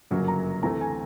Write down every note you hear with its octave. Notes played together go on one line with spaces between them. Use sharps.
G1 F#2 C#3 F#3 A#3
A#5
D2 C3 E3 A3 A#5
G#5